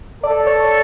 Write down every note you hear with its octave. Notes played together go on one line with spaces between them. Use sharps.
A4 D5
C#5